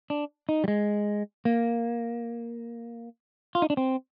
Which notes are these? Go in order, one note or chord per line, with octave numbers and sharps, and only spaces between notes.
D4
D#4
G3
G#3
A#3
F4
D#4
D4
C4